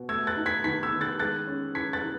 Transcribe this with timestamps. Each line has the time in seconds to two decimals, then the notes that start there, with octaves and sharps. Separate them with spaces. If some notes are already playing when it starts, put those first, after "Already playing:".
Already playing: B2
0.09 A3 E6 G#6
0.27 F#6 A6
0.37 D#4
0.46 G#6 B6
0.64 D#3 G#6 B6
0.83 E6 G#6
0.92 D#3
1.01 F#6 A6
1.19 G#3 F#6 A6
1.47 C#4
1.75 E3 G#6 B6
1.93 F#6 A6
2.03 E3